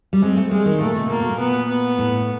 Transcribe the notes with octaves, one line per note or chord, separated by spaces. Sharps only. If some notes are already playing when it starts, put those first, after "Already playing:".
G3
G#3 C4
A3
G3 G#3
D#3
A#2 A3
C3
B2 A#3
B2
A#2
B3
B3
A2